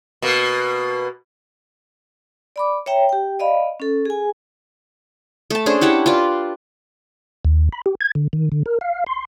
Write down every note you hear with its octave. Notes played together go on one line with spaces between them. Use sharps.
B2 A#3
D5 B5 D6
C#5 E5 G5 A#5
G4 G5
D5 D#5 F5 B5
C#4 A4
G#4 G#5
A3 A5
C#4 D4 G#4 C5
E4 G4 F#5 A5
F4 B4 D5
D#2
B5
G4
G#6
D3
D#3
D3
A#4
F5
C6